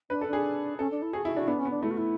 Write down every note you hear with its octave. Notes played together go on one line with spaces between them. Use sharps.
D4 B4
A4
D4
G#4
C#4 A4
D4
E4
F#4 G#4
E4 F#4
D4 F#4
B3 D4
C#4
B3
D4
A3 E4
F#4
E4